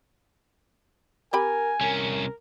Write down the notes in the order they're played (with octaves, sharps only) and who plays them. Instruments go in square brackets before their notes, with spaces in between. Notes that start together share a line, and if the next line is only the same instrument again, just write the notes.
[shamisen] C4 G4 B5 [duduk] A#4 [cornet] G#5
[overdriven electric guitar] C2 C#4 [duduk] A#4